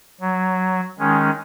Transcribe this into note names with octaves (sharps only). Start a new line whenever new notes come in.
F#3
D#3 G#3 C#4